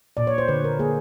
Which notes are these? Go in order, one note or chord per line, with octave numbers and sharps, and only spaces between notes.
A#2 D5
C#5
C5
D3 B4
A#4
A#3 G#4